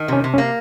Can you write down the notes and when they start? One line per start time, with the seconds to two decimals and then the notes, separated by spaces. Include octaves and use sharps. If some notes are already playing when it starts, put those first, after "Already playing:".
Already playing: D#3
0.08 C3 C#4
0.24 C3
0.34 C#4
0.38 A#3